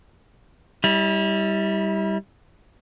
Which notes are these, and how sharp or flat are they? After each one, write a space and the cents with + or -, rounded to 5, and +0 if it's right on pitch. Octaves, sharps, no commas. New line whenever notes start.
G3 +0 E4 -35